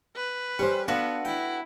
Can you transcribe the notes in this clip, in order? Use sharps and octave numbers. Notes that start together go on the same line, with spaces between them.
B4
G3 C#4 G4 C5 C#6
B3 D4 F4 F#4 A4 B4
E4 G5